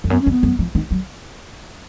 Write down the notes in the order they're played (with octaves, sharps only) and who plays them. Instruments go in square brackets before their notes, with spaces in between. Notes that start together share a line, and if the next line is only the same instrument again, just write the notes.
[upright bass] F2
[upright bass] F#2 [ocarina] B3
[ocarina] C#4
[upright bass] F2
[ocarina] B3
[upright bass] F#2
F3
D#3
F#3